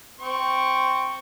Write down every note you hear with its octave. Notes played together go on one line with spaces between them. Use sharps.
C4 C#6